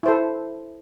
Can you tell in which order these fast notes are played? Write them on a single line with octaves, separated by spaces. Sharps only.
E4 C5 A4